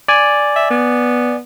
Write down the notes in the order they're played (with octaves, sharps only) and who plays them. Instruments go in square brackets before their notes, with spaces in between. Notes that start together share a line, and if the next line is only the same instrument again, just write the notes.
[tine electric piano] D5 G#5
[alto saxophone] E5
B3